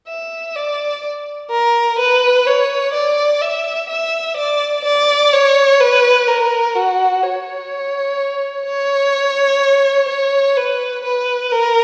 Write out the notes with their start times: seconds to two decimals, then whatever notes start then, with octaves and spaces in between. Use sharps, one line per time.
0.08 E5
0.55 D5
1.50 A#4
1.99 B4
2.46 C#5
2.93 D5
3.41 E5
3.89 E5
4.37 D5
4.84 D5
5.33 C#5
5.80 B4
6.27 A#4
6.75 F#4
7.22 C#5
8.66 C#5
10.09 C#5
10.57 B4
11.04 B4
11.52 A#4